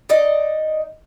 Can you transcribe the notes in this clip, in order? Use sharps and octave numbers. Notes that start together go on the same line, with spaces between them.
D#4 D5 D#5